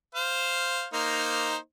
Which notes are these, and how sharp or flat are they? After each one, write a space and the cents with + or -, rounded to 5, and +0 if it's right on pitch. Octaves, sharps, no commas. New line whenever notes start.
C5 +0 F5 -5
A#3 +0 D#4 +0 C5 +0